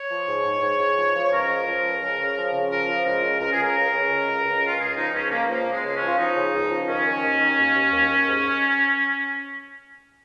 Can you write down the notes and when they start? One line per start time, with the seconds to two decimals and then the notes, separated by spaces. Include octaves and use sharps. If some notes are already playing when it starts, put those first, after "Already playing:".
Already playing: C#5
0.10 F3
0.28 G#2
0.45 G#2
0.61 G#2
0.80 G#2
0.96 F3
1.15 F3
1.23 C#5
1.31 C#2 A#4
1.50 F3
1.66 F3
1.83 C#2
2.02 C#3
2.19 C#3
2.36 F3
2.53 C#3
2.70 F3 A#4
2.88 F3
3.05 C#2 A#4
3.22 C#3
3.39 C#2 A#4
3.51 G#4
3.58 C#2 A#4
3.75 C#3
3.93 C#3
4.09 C#2
4.26 C#2
4.44 C#2
4.62 C#3 F4
4.79 C#2 G#4
4.96 F3 D#4
5.14 C#2 C#4
5.31 C#2 A#3
5.48 F3 A#3
5.65 C#2
5.72 G#3
5.84 C#3
5.95 C#4
6.01 F3
6.07 F4
6.17 F3 D#4
6.35 C#3
6.53 C#2
6.70 F3
6.87 D#3 C#4
7.05 D#3
7.23 D#2
7.40 D#3
7.58 D#2
7.75 D#2
7.92 D#2
8.09 D#2
8.27 G#2